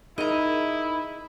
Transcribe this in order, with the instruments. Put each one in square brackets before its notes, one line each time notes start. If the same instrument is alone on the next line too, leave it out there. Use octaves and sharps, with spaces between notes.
[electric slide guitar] D#4 G#4 A#4 [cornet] E4 [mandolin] D#5 A#5